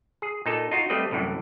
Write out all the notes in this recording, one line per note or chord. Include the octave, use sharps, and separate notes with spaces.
G#4
A#2 D#4 A4
D#4 F4 F#4
G3 A3 C4 B4 D#5
C2 F#2 A2 E3